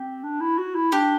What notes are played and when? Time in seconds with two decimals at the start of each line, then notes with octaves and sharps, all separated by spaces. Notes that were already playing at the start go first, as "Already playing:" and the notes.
Already playing: C4 G4
0.24 D4
0.40 E4
0.58 F#4
0.75 E4
0.92 D4 G4